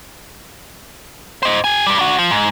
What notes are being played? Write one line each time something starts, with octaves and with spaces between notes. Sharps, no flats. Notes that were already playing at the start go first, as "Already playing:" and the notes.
C5 D#5
G4 G#5
G2 G3
D4 F#4
F3
G#2